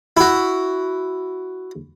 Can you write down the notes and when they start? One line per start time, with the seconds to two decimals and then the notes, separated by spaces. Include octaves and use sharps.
0.17 E4 F#4